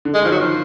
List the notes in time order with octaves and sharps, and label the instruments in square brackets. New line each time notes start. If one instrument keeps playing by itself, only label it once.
[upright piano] D3
[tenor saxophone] G#3
[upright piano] D#3 [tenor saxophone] F3
[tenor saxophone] F#3
[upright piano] D#3 [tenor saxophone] F3